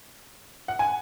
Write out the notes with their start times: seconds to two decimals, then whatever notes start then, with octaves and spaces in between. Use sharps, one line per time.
0.68 F#5
0.79 G#5